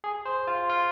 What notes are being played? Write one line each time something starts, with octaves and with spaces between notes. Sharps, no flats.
G#4
C5
F4
F4